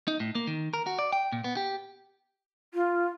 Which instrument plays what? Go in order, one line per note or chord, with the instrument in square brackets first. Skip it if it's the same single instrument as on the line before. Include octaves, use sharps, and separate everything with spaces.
[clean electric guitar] D#4
A2
A#3
D#3
A#4
F#4
D5
G5
A#2
B3
G4
[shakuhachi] F4